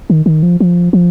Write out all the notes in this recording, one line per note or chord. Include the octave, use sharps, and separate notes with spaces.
D#3
D#3
F3
F3
F3